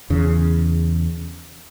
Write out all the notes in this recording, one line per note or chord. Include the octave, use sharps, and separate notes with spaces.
E2 C#3